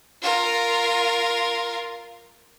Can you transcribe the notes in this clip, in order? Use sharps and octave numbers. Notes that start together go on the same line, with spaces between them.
F4 A#4